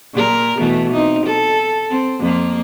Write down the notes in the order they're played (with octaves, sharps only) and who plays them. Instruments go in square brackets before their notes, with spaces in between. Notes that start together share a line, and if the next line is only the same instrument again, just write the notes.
[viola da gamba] A#2 A#4
B2 E3 A3
C4 D#4
A4
C4
F2 A#3